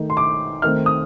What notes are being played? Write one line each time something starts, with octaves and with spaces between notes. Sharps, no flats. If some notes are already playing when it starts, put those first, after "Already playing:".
Already playing: D#3 A3 D#4
C6
D6
D#3 A3 C4 F6
D#6